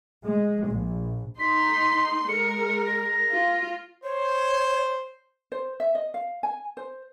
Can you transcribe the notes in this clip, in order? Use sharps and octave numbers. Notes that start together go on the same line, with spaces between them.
G#3
A#1
D#4 C6 B6
G#3 A#4 C#7
A#6
F4
C5 C#5
C5
E5
D#5
F5
G#5
C5